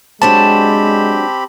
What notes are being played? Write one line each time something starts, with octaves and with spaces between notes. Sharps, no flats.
F#3 G#3 C4 D4 G4 C5 A5 B5